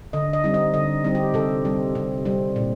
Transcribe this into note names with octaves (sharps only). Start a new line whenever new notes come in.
D3 D#5
D#5
G3 C4 D#4
D#5
D3 D#5
G3 C4 D#4
G4
C3 A4
G3 C4
C3
G3 C4
A#2